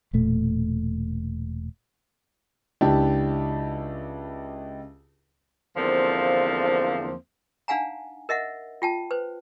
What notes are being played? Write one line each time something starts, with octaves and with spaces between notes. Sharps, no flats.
E1 A#2 A3
C#2 D4 E4 G4 A5
E2 D3 F3 A#3 C4
D4 D#4 F5 F#5 G#5 A#5
A#4 D#5 E5 F#5
F4 G5 A5
B4 C5